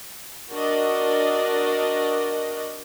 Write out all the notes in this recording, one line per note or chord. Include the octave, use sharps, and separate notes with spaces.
D4 F#4 A#4 D5 D#5